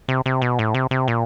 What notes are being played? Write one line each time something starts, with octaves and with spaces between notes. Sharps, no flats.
C3
C3
B2
A2
C3
C3
A#2